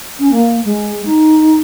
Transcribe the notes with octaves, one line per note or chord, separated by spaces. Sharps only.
C#4
A#3
G#3
D#4